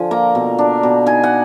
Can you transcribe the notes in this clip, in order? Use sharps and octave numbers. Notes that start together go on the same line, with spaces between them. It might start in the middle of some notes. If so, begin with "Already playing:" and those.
Already playing: D3 F3 G#5
A#3 A#5
B2
D4
B2
D#4 G#5
F#5